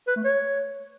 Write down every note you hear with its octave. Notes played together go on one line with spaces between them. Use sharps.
B4
A3
C#5